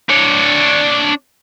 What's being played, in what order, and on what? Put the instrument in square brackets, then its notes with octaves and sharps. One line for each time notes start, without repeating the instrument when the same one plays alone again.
[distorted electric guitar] D4 C#5